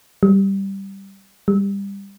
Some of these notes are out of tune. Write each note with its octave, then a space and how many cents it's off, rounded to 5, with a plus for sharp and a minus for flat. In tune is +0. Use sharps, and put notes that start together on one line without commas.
G3 -5
G3 +20